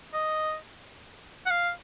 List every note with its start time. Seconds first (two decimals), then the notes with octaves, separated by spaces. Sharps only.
0.13 D#5
1.46 F#5
1.50 F5